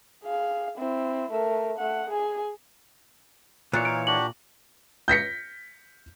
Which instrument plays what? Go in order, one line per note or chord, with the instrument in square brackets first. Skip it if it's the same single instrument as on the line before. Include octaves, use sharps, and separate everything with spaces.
[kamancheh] G#4 F5
C4 E4
A3 A#4
A3 F#5
G#4 G#5
[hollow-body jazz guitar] A#2 [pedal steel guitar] E3 F4 C#5 [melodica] D5 [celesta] F#6
[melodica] D#4 A#4 [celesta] D7
[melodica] D4 F#4 G4 [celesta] F#7
[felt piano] G6 A#6 B6 C#7